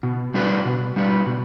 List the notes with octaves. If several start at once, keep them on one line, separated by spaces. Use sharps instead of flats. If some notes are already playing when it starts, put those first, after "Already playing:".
B2
G3 D4 F#4 B4
B2
G3 D4 F#4 B4
B2